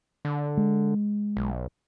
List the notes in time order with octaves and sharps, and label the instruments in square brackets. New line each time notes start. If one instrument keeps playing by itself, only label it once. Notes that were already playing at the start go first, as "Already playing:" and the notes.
[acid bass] D3
[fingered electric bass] G#3
[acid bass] B1